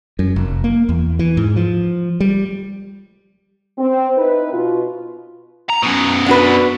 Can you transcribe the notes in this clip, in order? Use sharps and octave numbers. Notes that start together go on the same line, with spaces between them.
F#2
F1
A#3
E2
E3
G#2
F3
G3
C4
D#4 E4 B4
B2 F4
A#5
F#2 B2
D4 F#4 B4